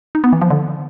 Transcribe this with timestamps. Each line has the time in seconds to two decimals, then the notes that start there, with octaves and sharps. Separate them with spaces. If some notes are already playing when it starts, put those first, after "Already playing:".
0.15 D#4
0.24 B3
0.33 E3
0.42 F3
0.50 D3